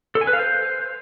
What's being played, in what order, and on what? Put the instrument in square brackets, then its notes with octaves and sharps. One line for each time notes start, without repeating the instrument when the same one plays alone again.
[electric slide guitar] A4
G#5
B4
F5
C5